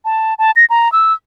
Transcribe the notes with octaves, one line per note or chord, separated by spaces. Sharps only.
A5
A5
A#6
A#5
E6